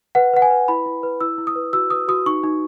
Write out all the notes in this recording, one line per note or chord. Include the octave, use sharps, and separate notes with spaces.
B4 F#5
B4 F#5
G#5
B4
E4 B5
E4
B4
E4 E6
E4
D#6
B4
F#4 E6
B4 D#6
F#4 D#6
D#4 C#6
D#4